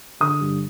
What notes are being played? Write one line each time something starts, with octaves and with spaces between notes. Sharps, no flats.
D3 D#6
G2